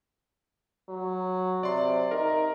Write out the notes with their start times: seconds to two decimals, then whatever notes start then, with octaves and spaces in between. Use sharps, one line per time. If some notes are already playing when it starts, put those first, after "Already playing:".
0.89 F#3
1.63 C3 D5 C6
2.11 D#4 A#4